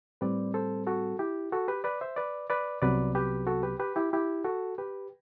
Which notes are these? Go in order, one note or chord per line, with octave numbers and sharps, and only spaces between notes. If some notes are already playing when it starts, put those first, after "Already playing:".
A2 G3 C4 B4 D5
A4 C5
F#4 A4
E4 G4
F#4 A4
G4 B4
B4 D5
C5 E5
B4 D5
B4 D5
C2 C3 F#3 B3 B4 D5
G4 B4
F#4 A4
G4 B4
G4 B4
E4 G4
E4 G4
F#4 A4
G4 B4